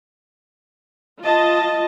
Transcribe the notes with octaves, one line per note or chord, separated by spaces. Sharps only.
F4 D#5 A5